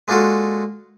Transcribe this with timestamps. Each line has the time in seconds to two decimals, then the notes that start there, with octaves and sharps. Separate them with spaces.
0.08 G#3 A#3 D4 F4 F#4 A4